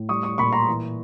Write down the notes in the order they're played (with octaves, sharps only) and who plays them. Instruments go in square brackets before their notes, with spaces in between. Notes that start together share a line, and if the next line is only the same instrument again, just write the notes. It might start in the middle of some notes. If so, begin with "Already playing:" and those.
Already playing: [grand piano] A2
G3 C#6 D#6
C#6 D#6
A#2 B5 C#6
A#5 C6
E3